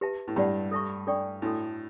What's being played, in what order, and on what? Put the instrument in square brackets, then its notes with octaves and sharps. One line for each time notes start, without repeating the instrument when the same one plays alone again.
[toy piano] G4 B4 E5 A5
[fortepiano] A2
[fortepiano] G2 [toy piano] G4 D5 F#5
[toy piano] A4 E5 A5 C#6
D4 A4 D5 G5 C#6
[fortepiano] A2 [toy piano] D4 F#4 A4